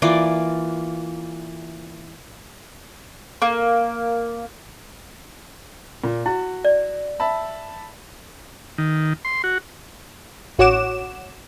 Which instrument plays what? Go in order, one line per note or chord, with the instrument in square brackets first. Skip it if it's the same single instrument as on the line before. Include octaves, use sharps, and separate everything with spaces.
[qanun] E3 A#3 F4 D5
[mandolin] A#3
[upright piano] A#2
[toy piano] E4 [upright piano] F#4
[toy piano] D5
[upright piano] E5 A5 B5
[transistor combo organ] D#3
C6
F#4
[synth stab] A1 F#4 C#5 F#5 D6 E7